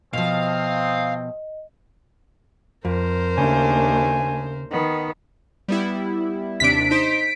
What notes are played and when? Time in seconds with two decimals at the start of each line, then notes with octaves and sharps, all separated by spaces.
0.13 B2 F3 A3 C4 D#5 F5 D#6
2.85 F2 A#4 C5
3.37 D#2 C#3 A3 D4 G#5
4.71 D#3 B3
5.68 G3 B3 E4
6.60 D#2 C3 D4 B6 D7
6.91 D#4 C5